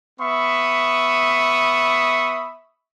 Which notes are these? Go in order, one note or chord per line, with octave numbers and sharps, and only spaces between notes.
B3 E5 B5 C#6 D#6